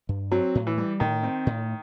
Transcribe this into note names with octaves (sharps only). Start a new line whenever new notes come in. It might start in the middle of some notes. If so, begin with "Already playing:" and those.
G2
F#3 C4
A2
E3
G3
A2 D#3
C4
A2